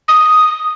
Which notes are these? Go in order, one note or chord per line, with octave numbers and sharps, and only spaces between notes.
D#6